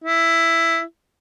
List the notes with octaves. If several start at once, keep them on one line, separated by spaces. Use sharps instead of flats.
E4